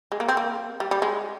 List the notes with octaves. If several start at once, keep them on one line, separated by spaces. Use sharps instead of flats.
G#3
A#3
C4
A#3
G3
G3
G#3